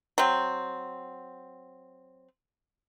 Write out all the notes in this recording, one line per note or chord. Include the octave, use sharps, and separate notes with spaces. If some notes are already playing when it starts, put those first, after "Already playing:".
F#3 C4